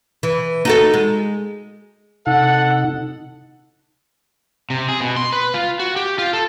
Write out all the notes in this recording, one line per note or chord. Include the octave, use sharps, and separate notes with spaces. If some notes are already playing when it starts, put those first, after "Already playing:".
E3
D#4 F#4 A4
G#3
C3 D#4 A4 F#5
C3
G#4
B2
C6
B4
F4
F#4
G4
F4
A4